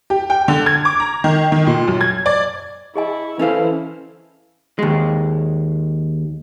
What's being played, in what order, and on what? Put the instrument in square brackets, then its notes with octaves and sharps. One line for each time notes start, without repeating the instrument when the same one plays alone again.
[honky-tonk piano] G4
G5
D3
G#6
D6
A#5
D#3
D#3
A#2
F#2
G#6
D5
[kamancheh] E4 C#6 [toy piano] G#4 D#5 G#5
[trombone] E3 [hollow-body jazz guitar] C#4 A4 F5 [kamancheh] E4 C5
[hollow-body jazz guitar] D#2 G#3